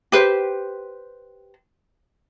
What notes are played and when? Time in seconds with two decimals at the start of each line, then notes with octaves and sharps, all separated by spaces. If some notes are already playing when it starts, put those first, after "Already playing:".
0.12 G4 B4 C5